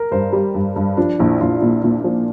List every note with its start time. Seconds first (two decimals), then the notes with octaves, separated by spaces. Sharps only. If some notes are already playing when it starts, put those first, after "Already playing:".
Already playing: A#4
0.12 G2 C5
0.33 G3
0.54 G2
0.76 G2
0.97 F3 D4
1.19 A#1 E4
1.41 A#1 F4
1.62 A#2 E4
1.83 A#2 D4
2.04 F3